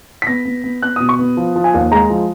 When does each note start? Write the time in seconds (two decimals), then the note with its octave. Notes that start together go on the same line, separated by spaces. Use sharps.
0.22 B6
0.27 B3 A#6
0.45 B3
0.64 B3
0.82 B3 F#6
0.96 D#6
1.00 B2
1.09 C#6
1.19 B3
1.37 F3
1.56 F3
1.64 G#5
1.74 D#2
1.92 G#3 A#5
2.10 F3